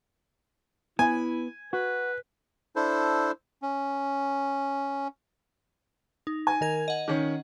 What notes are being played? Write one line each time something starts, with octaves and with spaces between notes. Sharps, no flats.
B3 E4 G#5
F#4 B4
D4 E4 A4 C5
C#4
D#4
G#5
D#3 A#4 G#6
D#5 F#5
D#3 C#4